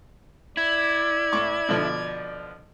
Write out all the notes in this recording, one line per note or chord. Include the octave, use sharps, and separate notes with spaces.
E4 D5 G#6
A2 C#6 D6
B2 D3 F3